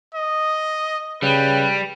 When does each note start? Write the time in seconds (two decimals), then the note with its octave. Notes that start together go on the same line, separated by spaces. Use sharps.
0.15 D#5
1.22 C#3 G3 B4